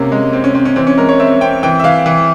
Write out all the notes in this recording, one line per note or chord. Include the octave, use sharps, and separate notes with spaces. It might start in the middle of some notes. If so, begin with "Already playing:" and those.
Already playing: C3 A#3 C#4
G#3
C4
C#4
C4 C#4
C#4
E3 C4
C#4
G#3 A#4
C#5
C4 E5
C4 G5
E3 G5
E5
E3 F5
E3